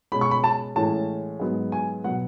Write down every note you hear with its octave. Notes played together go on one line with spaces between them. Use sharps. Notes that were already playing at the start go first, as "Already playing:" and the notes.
B2 G#3 C#4 B5
C#6
B5
A5
A2 E3 G#3 C#4 A5
G#2 F#3 B3
G#5
B2 F#3 B3 F#5